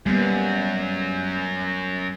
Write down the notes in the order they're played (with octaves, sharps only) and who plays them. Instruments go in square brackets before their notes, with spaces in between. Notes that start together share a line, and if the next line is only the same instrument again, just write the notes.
[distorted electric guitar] F#2 [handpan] G3 A#3 B3